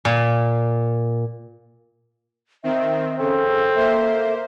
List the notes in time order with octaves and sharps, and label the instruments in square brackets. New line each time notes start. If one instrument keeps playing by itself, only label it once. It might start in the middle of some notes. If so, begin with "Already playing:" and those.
[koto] A#2
[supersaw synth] D#3 C4 [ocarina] E5
[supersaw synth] C#3 [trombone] C4 [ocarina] A4
[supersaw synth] A#3 C5 [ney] E5